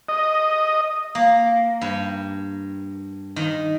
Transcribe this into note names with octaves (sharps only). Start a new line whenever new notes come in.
D#5
A#3
G2
D#3